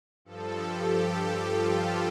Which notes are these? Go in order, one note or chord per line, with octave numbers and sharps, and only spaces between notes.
G2 F3 A4
G4
F4